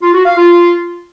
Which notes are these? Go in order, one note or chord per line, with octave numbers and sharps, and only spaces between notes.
F4
F#4
F5
F4